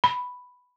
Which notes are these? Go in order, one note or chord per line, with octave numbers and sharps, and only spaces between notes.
B5